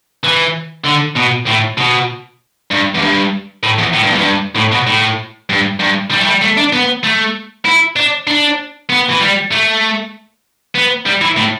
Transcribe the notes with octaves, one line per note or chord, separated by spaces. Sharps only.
E3
D3
B2
A2
B2
G2
E2
G2
A2
E2
A2
G2
E2
G2
A2
B2
A2
G2
G2
G3
A3
G3
A3
D4
B3
A3
E4
D4
D4
B3
E3
G3
A3
B3
G3
E3
A2